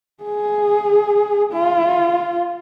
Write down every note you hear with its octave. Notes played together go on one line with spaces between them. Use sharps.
G#4
F4